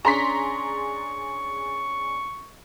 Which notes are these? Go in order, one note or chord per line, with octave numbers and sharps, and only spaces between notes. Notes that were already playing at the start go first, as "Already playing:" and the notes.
C#4 D4 G#4 A#5 C6 C#6 B6